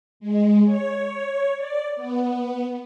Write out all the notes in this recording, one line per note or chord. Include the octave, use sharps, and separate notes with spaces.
G#3
C#5
D5
B3